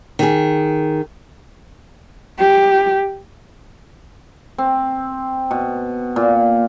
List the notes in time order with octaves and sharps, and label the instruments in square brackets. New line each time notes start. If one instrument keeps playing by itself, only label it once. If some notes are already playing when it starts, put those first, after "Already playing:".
[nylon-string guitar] D#3 G#4
[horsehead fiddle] G4
[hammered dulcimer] C4
B2
A#2